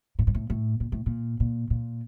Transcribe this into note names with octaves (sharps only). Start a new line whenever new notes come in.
A2
G#2
A2
A2
A#2
A2
A#2
A#2
A#2